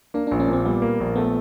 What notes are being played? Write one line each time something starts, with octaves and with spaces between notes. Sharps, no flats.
A#3 D4
D4
A#1
C#4
A#2 C4
G3 B3
A#3
A#1
A3 B3